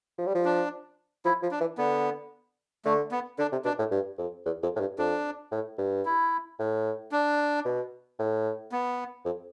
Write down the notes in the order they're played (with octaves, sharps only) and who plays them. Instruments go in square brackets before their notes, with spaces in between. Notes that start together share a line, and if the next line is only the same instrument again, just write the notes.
[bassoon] F3
G3
F3
[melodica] D4
[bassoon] F3 [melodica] E4
[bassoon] F3
[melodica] D4
[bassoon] E3
[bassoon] D3 [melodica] B3
[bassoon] D3 [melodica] A3
[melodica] B3
[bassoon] D3 [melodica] D4
[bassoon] C3
[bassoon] B2 [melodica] D4
[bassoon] A2
G2
F2
E2
F2
A2
G2
[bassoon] F2 [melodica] D4
[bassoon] A2
G2
[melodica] E4
[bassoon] A2
[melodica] D4
[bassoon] B2
A2
[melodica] B3
[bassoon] F2